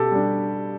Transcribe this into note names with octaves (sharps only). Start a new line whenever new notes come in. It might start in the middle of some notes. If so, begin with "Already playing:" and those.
Already playing: B2 G4 A4
G3 D4